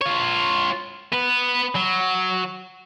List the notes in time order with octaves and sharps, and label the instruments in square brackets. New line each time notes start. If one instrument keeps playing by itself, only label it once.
[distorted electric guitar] F4 C#5
B3 B4
F#3